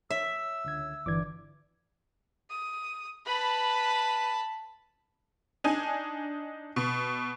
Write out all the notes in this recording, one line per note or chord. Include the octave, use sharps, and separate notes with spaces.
C#5 E5 E6
C#2 D3 G#6
G1 D3 E3 D5 D6 G#6
D#6
B4 A5 B5
D4 D#4 G#5
B2